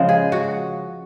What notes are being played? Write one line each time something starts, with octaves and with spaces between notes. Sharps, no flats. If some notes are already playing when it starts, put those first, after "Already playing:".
Already playing: C#3 F3 G#3 C5
G#4
F#4